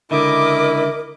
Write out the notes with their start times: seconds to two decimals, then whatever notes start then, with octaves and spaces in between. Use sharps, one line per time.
0.11 C#2 D3 E4 A#4 D#5 D6